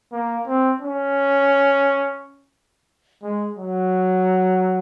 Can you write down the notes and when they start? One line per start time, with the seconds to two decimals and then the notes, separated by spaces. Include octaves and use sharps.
0.12 A#3
0.47 C4
0.82 C#4
3.23 G#3
3.57 F#3